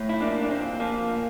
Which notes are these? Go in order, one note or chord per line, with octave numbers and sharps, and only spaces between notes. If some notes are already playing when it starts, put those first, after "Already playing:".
Already playing: A2
E4
F3 A#3 D4
D4
A#2 C4
F3 A#3
A#2